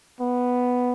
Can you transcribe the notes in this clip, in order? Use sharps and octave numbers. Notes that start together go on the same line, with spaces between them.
B3